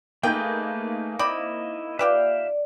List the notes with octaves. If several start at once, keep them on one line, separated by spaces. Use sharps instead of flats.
A3 A#3 D#4 G#4 B4 G5 G6
C4 E4 D5 D#5 B5
F4 G4 B4 D5 E5 F5 G5